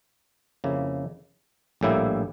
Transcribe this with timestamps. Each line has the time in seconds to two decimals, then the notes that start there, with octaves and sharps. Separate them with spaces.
0.64 F2 C#3 F3 A#3 E4
1.81 A#1 A2 G3 A#3 E4